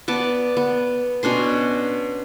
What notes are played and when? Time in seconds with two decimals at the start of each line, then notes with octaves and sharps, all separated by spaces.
0.08 B3 D5 A5
0.57 B3
1.23 B2 C#4 D4 C6